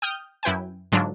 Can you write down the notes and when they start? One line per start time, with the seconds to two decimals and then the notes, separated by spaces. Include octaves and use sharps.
0.02 G5 D#6 F6 G6
0.43 F#2 E4 B4 G5 G#5
0.92 G#2 D3 F#3 D4 F4